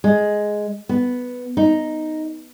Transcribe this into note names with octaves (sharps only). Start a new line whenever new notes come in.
G#3
B3
D#4